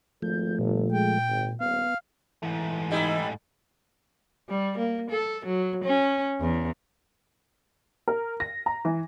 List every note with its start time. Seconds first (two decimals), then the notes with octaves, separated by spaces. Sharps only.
0.22 G#1 F3 A3 G6
0.59 G1 A#2
0.92 G#3 G5
1.29 G#1
1.60 D#1 B3 F5
2.43 G#2 E3 A3
2.91 G3 D#4 E4
4.49 G3
4.78 A#3
5.10 A4
5.46 F#3
5.84 C#4
6.41 E2
8.08 A#4
8.40 A#6
8.66 A#5
8.85 E3